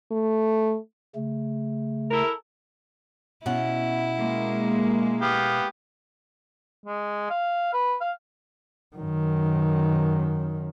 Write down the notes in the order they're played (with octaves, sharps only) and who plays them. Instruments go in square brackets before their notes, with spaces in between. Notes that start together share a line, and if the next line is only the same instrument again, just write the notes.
[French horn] A3
[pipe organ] C#3 A3
[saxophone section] E4 A4 A#4
[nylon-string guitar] B2 C#4 F#5 [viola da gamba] E4
[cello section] G#3 A#3
[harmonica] B3 G4 F5
[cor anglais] G#3
F5
B4
F5
[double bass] F#2 D#3